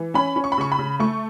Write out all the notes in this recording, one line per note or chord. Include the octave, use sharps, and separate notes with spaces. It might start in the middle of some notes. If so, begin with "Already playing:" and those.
Already playing: E3
C#4 B5
C#4
C#6
B5
C#3 C#6
B5
C#3
A3 C#6